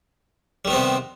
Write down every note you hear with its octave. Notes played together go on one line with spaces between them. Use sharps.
C3 D#3 G3 B3 C4